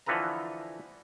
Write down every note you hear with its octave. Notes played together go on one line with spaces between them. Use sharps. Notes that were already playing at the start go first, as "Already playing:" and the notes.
D3 E3 F3 A4 B4 A#5